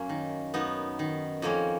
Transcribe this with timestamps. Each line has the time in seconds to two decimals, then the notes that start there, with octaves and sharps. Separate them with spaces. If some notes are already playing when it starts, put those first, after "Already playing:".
Already playing: F#2 A#3 C#4
0.09 D#3
0.54 F#2 B3 D#4
0.99 D#3
1.42 F2 A#3 C#4